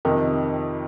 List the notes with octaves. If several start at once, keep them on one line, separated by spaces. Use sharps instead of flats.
F2 C3 D#3